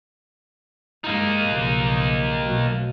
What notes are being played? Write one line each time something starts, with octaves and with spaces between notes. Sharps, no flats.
G2 G#3 A#3 D#4
B1 C#3 F3
B2 F#3 A3